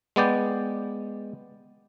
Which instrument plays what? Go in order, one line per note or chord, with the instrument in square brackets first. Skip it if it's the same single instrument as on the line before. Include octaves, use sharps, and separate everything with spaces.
[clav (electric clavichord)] G#3 B3 D5 G5